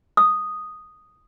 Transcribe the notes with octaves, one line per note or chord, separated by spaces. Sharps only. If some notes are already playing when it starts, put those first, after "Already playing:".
D#6